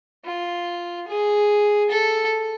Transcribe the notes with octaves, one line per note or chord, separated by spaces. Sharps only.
F4
G#4
A4